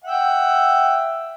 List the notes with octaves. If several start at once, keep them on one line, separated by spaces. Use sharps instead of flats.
E5 F#5 G5